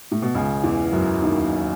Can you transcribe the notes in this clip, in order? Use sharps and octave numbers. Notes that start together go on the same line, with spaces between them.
A2
B2
C#2 C#3
E2 E3
F#2 F#3
D#2 D#3